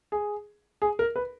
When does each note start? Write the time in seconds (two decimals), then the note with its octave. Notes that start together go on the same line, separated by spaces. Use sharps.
0.12 G#4
0.82 G#4
0.99 A#4
1.16 B4